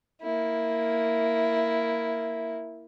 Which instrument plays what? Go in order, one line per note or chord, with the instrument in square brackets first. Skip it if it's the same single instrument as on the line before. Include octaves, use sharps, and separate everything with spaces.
[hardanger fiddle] A#3 E4